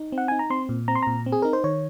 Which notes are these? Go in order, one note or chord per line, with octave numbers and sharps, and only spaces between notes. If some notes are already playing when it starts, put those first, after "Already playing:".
Already playing: D#4
C4
F#5
D#4 G#5
A#5
C4 C6
A#2
C4 A#5
C6
A#2 A#5
C4
G#4
D#4 A#4
C5
D#3 C#5